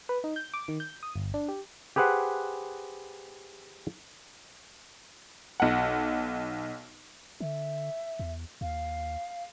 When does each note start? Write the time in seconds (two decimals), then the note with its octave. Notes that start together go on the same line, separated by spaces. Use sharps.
0.09 B4
0.24 D#4
0.36 G6
0.54 D6
0.68 D#3
0.80 G6
1.03 D#6
1.16 G1
1.34 D4
1.48 G4
1.96 G4 G#4 B4 C5 F#5
5.60 B1 F#5
7.40 D3 E5
8.19 E2
8.61 D#2 F5